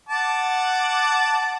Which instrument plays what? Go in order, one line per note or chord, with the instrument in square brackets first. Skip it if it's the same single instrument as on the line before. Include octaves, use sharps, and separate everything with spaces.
[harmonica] F#5 A5 D6